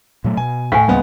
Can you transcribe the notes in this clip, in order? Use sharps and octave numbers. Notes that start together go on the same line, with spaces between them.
A#2 F#3 A3
B2 G#5
A2 F5 G#5
C#2 G3 A#3 B3